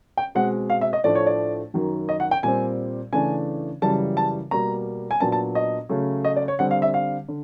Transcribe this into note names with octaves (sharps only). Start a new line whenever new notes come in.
G5
B2 G#3 C4 F#5
F5
E5
D#5
A2 F3 A3 D4 D5
C#5
D5
F#2 D#3 F#3
D#5
F#5
G5
A#2 G3 C4 G#5
C#3 E3 A3 D4 G#5
F#2 C#3 E3 G3 A5
A5
B2 G3 A#3 A#5
G#5
A#2 F#3 B3 D4 A5
A5
D#5
C#3 F#3 A3 C#4
D#5
D5
C#5
D3 G3 C4 F#5
F5
E5
F5
D3